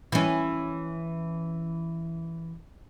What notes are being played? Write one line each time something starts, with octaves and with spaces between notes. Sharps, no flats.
E3 C#4